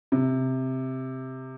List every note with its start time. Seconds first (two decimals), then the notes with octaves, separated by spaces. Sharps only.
0.12 C3